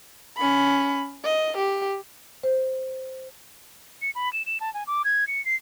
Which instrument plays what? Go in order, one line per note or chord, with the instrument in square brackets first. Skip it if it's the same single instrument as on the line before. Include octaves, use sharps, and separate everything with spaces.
[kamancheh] C#4 B5
D#5
G4
[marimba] C5
[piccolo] C#7
B5
E7
E7
A5
G#5
D6
G#6
C#7
C7